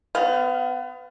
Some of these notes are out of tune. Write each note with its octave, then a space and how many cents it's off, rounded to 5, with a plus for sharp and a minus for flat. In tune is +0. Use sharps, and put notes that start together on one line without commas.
B3 +35 F5 +5